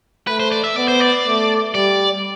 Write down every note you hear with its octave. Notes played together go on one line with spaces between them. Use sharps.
A3 B4
C5
D5
E5
B3 D5
C5
D5
A3
G3 D5